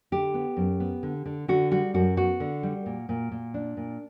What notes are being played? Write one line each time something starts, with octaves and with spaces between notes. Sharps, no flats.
D3 G4
B3
F#2
B3
D3
D3
D3 F#4
G3 F#4
F#2 F#4
B3 F#4
D3
G3
A#2
A#2
A#2
D4
A#2